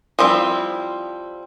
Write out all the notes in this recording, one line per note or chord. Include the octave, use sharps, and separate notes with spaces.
F3 G3 C4 E4